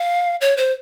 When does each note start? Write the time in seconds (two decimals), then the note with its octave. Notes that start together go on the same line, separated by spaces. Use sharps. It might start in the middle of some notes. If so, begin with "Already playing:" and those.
Already playing: F5
0.41 C#5
0.57 C5